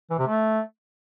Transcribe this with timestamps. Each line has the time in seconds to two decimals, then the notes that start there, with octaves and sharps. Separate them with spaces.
0.10 E3
0.19 C3
0.28 A3